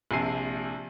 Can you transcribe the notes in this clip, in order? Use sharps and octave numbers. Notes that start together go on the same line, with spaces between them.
A#1 C3 G#5 A5 C7 D#7